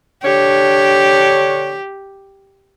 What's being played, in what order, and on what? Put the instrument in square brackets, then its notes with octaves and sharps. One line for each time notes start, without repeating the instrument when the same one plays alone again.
[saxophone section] D3 D4 C#5 [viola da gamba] G4